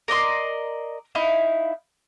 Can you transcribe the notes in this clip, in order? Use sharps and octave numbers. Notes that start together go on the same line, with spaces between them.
A#4 D5 D#5 C6
D#4 E4 F5